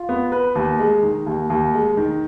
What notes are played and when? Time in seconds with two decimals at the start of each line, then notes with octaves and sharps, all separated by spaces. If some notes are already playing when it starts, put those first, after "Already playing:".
Already playing: F4
0.09 B3
0.32 B4
0.55 D#2
0.79 G#3
1.03 D#3
1.26 D#2
1.50 D#2
1.74 G#3
1.97 D#3